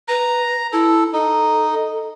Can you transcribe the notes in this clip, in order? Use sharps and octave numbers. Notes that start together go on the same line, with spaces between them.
B4 A#5
E4 A4
D#4 A4